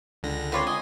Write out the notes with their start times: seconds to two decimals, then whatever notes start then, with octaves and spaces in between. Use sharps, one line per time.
0.23 C#2 D3 A#6
0.52 C4 F4 B4 C#5 D5 C6
0.67 D#5 G#5